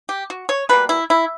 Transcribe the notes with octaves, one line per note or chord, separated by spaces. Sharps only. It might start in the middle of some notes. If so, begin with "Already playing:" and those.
G4
F#4
C#5
B2 G3 A#3 B4
E4
E4